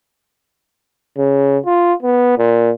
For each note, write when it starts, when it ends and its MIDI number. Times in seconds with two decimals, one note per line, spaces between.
1.18 1.58 49
1.66 1.93 65
2.03 2.36 59
2.38 2.71 46